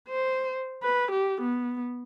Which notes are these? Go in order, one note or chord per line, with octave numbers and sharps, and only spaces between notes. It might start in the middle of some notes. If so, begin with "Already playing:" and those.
C5
B4
G4
B3